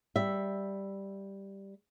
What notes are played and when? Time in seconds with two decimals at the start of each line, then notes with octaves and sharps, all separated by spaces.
0.16 G3 E5